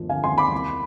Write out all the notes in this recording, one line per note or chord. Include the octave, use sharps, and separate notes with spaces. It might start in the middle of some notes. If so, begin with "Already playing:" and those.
Already playing: G1 D#2 F3
D3 F5 G#5
G#5 C6
D#2
B5 D6
C2